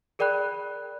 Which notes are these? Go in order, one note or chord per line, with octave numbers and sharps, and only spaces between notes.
G#4 A#4 D5 G5 B5 F#6